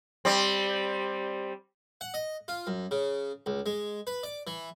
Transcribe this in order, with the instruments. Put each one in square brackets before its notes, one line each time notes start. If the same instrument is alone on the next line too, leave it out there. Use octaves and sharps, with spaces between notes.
[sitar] G3 C4
[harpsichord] F#5
D#5
F4
F#2
C#3
C#2
G#3
B4
D5
E3